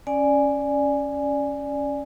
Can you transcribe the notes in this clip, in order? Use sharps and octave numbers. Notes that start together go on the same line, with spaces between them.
C#4 D5 G#5